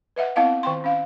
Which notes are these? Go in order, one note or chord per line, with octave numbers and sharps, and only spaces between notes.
B4 D#5 E5 F#5
B3 C4 E4 D#5 F5 F#5
D#3 G5 C6
C#4 F5